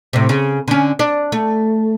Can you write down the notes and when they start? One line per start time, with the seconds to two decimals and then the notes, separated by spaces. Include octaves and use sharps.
0.13 A2 C3
0.29 C#3
0.68 D3 C#4
0.99 D4
1.32 A3